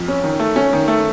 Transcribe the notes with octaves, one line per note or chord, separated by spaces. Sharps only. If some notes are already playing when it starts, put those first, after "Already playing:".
Already playing: F2
C#4
D#3
A3
C#4
D#3
A3